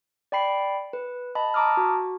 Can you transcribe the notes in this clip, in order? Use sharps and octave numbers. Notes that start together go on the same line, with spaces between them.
D5 G5 B5 C7
B4
D#5 A5 B5
A5 A#5 D6 D#6 F6
F#4